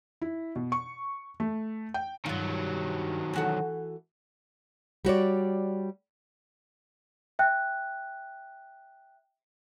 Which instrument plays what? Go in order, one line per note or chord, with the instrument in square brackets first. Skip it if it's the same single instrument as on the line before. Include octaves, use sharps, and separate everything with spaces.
[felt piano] E4
B2
C#6
A3
G5
[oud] G2 F4 [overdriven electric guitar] D#3 F#3
[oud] E3 F#4 A4
[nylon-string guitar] G3 F#4 C#5 D5
[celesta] E5 G5 F#6